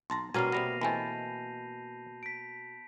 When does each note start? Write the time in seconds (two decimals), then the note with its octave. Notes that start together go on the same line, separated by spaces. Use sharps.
0.10 B1 A5 A#5 C6
0.34 B2 G3 A#3 C#4 G#5 C7 D#7
0.52 C3 G3 B3 B5 A#6 F7
0.81 E3 A3 C4 D#5 G#5 A5 B5 G6
2.23 B6 D7